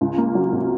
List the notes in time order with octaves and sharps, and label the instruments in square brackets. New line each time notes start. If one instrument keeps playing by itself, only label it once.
[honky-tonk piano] C#2
A#3
F#3
C3